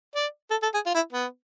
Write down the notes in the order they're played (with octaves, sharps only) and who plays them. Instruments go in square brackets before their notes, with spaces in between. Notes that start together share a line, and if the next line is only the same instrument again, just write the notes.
[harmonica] D5
A4
A4
G#4
F4
E4
B3